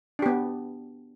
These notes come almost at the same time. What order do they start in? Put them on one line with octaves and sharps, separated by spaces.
D4 G4 B3